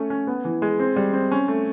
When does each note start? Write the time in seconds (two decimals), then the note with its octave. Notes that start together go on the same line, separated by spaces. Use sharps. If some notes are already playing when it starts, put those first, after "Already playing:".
Already playing: A3 C#4
0.10 C#4
0.27 B3
0.45 E3
0.62 G#3
0.79 C4
0.96 G3
1.13 C4
1.31 C#4
1.48 A3